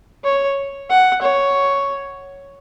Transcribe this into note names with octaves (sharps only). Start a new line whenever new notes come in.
C#5
F#5
C#5